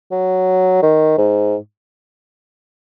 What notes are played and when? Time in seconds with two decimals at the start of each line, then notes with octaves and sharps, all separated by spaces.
0.11 F#3
0.82 D#3
1.18 G#2